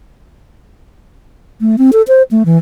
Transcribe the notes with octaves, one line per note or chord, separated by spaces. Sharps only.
A3
C4
A4
C5
A3
E3